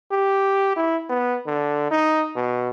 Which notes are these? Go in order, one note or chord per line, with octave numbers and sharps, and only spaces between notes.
G4
E4
B3
D3
D#4
B2